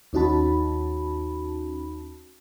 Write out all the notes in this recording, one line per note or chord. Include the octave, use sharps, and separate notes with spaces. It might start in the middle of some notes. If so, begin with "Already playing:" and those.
D#2 C#4 D#4 F#4 A5 B5